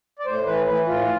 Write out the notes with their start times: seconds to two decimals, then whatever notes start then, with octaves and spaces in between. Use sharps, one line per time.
0.19 D5
0.26 A2 C5
0.46 E3 B4
0.67 E3 B4
0.87 A2 F4